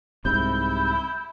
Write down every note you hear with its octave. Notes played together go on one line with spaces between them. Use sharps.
C2 G#2 C3 E4 G6